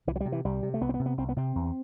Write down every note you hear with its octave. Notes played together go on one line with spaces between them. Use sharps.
C2 E3
F#3
C3 G3
E3
C2 G3
C3
A3
C2 B3
C4
B3
C3
B3
C2 C4
B3
C3 C4
E2